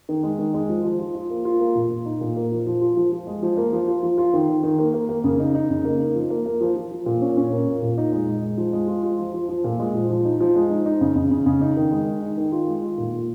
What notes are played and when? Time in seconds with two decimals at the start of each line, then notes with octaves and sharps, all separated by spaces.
0.09 D#3
0.23 G#3
0.39 D#3
0.54 G#3
0.69 F3
0.84 F3
0.99 F4
1.15 F4
1.30 A#3
1.45 F4
1.60 A#3
1.75 A#2
1.90 A#2
2.06 D#4
2.21 A#2
2.36 A#3
2.52 F3
2.66 F3
2.81 F4
2.97 F3
3.12 F3
3.27 G#3
3.42 F3
3.57 A#3
3.73 F3
3.88 F4
4.03 F3
4.18 F4
4.33 D#3
4.49 D#3
4.63 D#3
4.79 A#3
4.94 A#3
5.09 A#3
5.24 C#3
5.40 D#4
5.55 D#4
5.70 C#3
5.85 A#3
6.00 D#4
6.15 F3
6.30 A#3
6.46 A#3
6.61 F3
6.76 F3
6.91 F3
7.06 A#2
7.21 C#4
7.37 C#4
7.52 A#3
7.66 A#2
7.82 A#2
7.98 D#4
8.12 G#3
8.27 G#3
8.42 G#3
8.58 F3
8.73 G#3
8.88 F4
9.03 F4
9.19 F3
9.34 F3
9.49 F3
9.64 A#2
9.79 G#3
9.95 F3
10.10 F3
10.25 D#4
10.40 F3
10.55 G#3
10.70 D#4
10.86 D#4
11.01 C#3
11.16 C#3
11.31 C#3
11.46 C#3
11.61 D#4
11.77 D#3
11.92 G#3
12.07 D#4
12.22 D#4
12.37 D#3
12.52 F4
12.67 G#3
12.83 F4
12.98 A#2
13.13 A#2